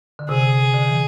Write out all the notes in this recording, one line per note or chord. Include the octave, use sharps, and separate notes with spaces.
D3
C3 G#4
D3
E3